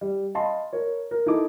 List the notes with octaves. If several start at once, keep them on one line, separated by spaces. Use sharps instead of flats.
G3
D#5 F5 A5 B5 C6
A#4 C#5
A#4
D#4 E4 A4 D6